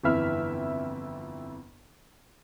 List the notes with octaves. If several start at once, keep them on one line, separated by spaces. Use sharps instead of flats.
G1 F2 E3 E4 E5 F6